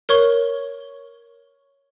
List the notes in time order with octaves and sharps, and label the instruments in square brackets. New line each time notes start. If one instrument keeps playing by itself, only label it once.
[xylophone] A#4 C#5 C#6 G7